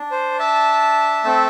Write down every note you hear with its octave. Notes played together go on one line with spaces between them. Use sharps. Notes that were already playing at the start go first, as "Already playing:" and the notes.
Already playing: D4
C5
E5 A5
A3 C4 A4